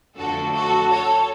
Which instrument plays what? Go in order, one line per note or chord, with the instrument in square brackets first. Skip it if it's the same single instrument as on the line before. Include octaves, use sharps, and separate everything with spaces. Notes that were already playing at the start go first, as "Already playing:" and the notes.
[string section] F2 D3 F3 A3 F#4 A4
F#4 A4
A4 C#5